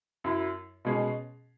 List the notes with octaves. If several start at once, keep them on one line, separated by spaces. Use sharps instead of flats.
F#2 F#3 E4
B2 G#3 C#4 G#4